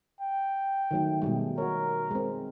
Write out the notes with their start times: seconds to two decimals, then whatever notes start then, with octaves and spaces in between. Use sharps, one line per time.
0.21 G5
0.91 D#3 F#3 A3
1.22 B2 G3 G#3
1.58 F#4 A#4 C#5
2.11 G#3 C4